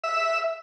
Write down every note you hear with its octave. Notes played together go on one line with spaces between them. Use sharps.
E5